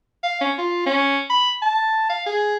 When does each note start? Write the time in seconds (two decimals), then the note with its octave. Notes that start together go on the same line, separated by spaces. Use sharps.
0.23 F5
0.41 C#4
0.58 F4
0.86 C#4
1.30 B5
1.62 A5
2.10 F5
2.26 G#4